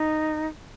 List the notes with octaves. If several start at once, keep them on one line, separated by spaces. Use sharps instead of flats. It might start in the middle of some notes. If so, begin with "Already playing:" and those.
Already playing: D#4